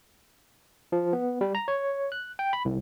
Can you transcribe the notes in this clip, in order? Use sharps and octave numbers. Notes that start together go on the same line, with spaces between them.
F3
B3
G3
A#5
C#5
F#6
G5
B5
C2